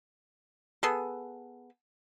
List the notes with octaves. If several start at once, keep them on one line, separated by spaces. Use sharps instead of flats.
B3 G#4 A4